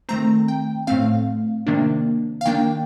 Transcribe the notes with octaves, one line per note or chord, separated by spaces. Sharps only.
D#3 A3 C4 A#5
G5
A2 A3 C4 F5
C3 D#3 A#3 D4
F5
D#3 A#3 D4 G5